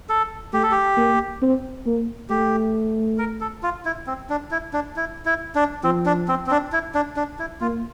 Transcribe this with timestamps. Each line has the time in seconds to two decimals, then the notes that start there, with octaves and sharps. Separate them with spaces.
0.09 A4
0.53 A3 G4
0.63 A4
0.72 G4
0.97 A#3
1.42 C4
1.86 A#3
2.30 A3 G4
3.18 A#4
3.41 A4
3.63 F4
3.85 E4
4.07 C4
4.30 D4
4.51 E4
4.73 D4
4.96 E4
5.25 E4
5.55 D4
5.84 F3 C4
6.06 D4
6.28 C4
6.47 C4
6.51 D4
6.72 E4
6.95 D4
7.17 D4
7.39 E4
7.61 A#3 F4